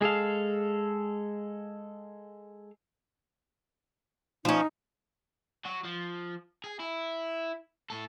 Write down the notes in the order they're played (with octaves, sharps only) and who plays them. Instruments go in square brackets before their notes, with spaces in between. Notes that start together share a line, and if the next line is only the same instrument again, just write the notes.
[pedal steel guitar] G#3 G#4 A4 F5
[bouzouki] F3 C#4 [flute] D#4
[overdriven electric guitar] F#3 F#4
F3
G#4
E4
A2 A4